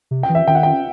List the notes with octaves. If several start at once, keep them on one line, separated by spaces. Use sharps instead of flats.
C3
G5
E3
E5
D#3 G5
F#5
G5